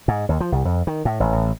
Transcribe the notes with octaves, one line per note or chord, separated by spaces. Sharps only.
G#2
D#2
F3
C2
F2
D#3
A2
A1
A1